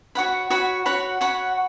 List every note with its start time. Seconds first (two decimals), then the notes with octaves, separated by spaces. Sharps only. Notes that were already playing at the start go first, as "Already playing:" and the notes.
0.15 F#4 C#5 F#5 B5
0.50 F#4 C#5 F#5 B5
0.86 F#4 C#5 F#5 B5
1.21 F#4 C#5 F#5 B5